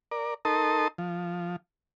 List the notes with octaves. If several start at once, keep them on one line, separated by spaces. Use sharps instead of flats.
A#4 D5
D#4 A4 A#4 A5 C6 D#6
F3